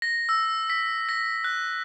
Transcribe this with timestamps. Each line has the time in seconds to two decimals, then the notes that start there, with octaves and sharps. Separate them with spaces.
0.02 A#6
0.29 E6
0.70 B6
1.09 A#6
1.44 F#6